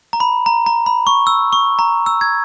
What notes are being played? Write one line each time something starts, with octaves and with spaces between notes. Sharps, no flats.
A#5
B5
A#5
A#5
B5
C#6
E6
C#6
A#5
E6
G#6